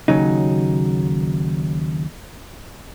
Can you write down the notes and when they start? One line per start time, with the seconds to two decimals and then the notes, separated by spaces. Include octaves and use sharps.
0.08 D#2 C#3 F#3 D#4